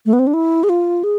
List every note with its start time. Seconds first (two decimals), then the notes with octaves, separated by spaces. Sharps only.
0.06 A3
0.13 B3
0.19 C4
0.27 D4
0.34 E4
0.64 G#4
0.69 F4
1.04 G#4